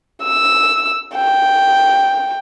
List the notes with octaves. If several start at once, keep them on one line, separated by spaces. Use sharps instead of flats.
E6
G5